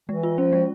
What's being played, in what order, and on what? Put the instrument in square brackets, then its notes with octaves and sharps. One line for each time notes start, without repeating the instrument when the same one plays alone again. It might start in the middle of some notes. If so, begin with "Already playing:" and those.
[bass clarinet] E3 [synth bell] G#3
[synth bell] F4
[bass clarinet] F3 [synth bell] C#4
[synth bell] G#3